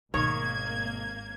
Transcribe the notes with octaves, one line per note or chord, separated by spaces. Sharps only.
G#1 B2 D#3 A3 A#3 C#5 G#6